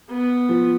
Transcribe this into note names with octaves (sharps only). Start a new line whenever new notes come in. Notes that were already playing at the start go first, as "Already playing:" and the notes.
B3
F3